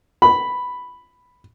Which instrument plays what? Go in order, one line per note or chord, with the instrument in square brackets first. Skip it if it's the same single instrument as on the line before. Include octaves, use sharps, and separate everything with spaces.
[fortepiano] B5